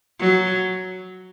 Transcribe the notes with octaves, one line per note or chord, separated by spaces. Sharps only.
F#3